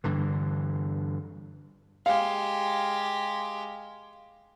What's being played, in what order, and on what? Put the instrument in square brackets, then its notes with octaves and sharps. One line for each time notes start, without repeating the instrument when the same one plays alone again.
[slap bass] G2 D3 E3
[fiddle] G#3 G4 [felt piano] F5